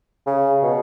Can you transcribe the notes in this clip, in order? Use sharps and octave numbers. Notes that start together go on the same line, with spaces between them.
C#3
B2